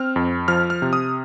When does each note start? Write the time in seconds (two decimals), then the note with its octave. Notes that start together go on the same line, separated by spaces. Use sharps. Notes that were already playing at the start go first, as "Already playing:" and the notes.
Already playing: C4 F6
0.16 F2
0.48 F3 F6
0.70 F6
0.82 C3
0.93 D#6